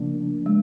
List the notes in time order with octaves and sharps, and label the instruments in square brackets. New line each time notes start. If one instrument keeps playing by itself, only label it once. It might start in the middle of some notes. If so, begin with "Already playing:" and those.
Already playing: [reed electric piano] C#3 F3 A#3 D4 [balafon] A3
[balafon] G#3